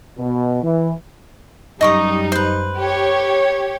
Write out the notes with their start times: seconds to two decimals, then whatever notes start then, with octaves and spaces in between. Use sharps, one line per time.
0.19 B2
0.63 E3
1.81 F#2 G3 D#4 D#5 C#6 D#6
2.32 B4 C5
2.79 G4 C#5